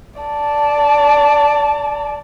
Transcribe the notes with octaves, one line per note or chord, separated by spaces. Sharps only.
D5 A5